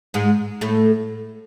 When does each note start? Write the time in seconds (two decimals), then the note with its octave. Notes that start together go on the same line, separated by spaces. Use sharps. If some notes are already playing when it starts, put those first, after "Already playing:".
0.14 G#2 G#3
0.61 A2 A3